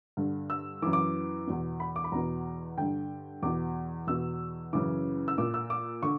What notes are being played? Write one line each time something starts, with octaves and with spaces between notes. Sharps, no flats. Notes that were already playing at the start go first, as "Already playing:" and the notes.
G2 D3
E6
F#2 E3 D6
D6
E2 B2
B5
D6
B5
E2 B2 A#5
G2 D3 G5
E2 B2 D6
E2 B2 E6
F#2 C#3 E3 D6
E6
A#2 D6
E6
D6
D3 C#6